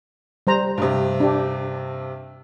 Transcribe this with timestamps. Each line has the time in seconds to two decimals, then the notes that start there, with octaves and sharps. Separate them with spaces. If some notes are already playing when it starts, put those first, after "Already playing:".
0.47 G3 C5 A#5
0.78 G2 C3
1.20 D4 G4